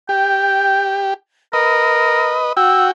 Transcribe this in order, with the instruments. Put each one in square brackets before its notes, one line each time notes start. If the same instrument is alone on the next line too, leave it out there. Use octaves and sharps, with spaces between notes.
[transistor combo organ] G4 [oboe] G5
[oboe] A#4 [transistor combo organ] B4 D#5
[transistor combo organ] F#4 G5 [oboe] E6